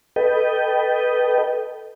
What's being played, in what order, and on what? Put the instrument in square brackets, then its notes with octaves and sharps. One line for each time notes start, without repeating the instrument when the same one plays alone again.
[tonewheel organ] A4 B4 D#5 G5